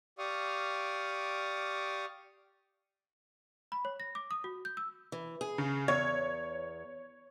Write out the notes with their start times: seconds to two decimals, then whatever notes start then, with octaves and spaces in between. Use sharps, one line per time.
0.18 G4 D5 F5 C#6 D#6 F6
3.72 B5
3.85 C#5
4.00 A#6
4.15 D6
4.31 D#6
4.44 F#4
4.65 G6
4.77 E6
5.12 E3
5.41 G#4
5.58 C#3
5.88 E2 C#5 G#6